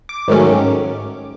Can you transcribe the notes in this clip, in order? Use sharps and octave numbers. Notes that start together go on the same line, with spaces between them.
D6
G#2 D#3 F#3 A3 C#4